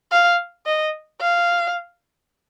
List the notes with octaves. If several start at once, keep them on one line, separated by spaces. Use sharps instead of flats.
F5
D#5
F5